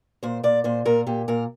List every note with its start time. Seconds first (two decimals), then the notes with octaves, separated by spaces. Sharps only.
0.23 A#2 C5
0.44 A#2 D5
0.64 A#2 C5
0.85 A#2 A#4
1.07 A#2 G4
1.28 A#2 A#4